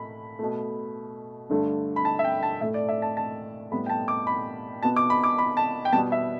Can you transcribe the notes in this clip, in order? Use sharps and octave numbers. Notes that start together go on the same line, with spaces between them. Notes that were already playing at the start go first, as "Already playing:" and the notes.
Already playing: A2 A3 B5
B2 A3
G2 D3 A3
B5
A5
E5
G5
A5
A2 A3 E5
D5
E5
A5
A5
A2 G3 B3 B5
G5
A5
D6
B5
B2 B3 A5
D6
B5
D6
B5
A5
G5
B2 G3 B3 A5
E5